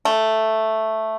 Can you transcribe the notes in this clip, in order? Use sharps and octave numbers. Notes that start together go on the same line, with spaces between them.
A3